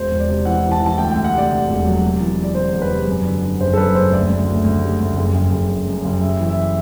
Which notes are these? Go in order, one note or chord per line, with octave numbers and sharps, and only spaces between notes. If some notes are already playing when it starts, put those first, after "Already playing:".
Already playing: E1 C5
E1
D5
C3
E3 F#5
E3
A5
E3
A5
D2 G5
G5
D2
F#5
C3 D5
C3
E1
F#3
C3
E3
G3
D5
C3 C5
E2
B4
C3
F#2
D3
D3
F#1 C5
A4
F#2 B4
F#1 C5
D2 D5
D2
D2
D2
G3
D2
F#1
F#1
F#1
F#1
F#2
F#1
G3 E5
E3
E5